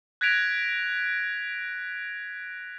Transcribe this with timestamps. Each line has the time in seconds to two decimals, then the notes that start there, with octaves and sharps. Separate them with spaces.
0.21 F#6 G#6 A#6 B6 D7 F7